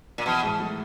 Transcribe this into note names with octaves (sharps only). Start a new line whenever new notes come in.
A#2
B2 E3
G#2
A3